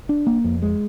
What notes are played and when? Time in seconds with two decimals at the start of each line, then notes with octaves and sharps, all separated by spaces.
0.09 D4
0.27 A#3
0.44 F2
0.62 G#3